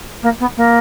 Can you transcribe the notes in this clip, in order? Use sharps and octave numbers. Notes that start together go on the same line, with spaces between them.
A#3
B3
A#3